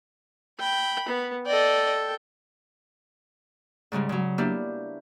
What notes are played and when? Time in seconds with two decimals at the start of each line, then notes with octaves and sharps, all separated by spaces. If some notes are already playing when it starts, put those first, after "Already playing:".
0.59 G5 B5
1.09 B3
1.47 A4 D5 D#5 G5
3.92 G#2 C#3 G3 G#3
4.09 C#3 F#3
4.38 A#3 B3 D4 E4 G4